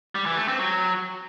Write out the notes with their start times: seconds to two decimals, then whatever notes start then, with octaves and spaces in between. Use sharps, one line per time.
0.15 G3
0.26 E3
0.37 A3
0.48 C4
0.59 F#3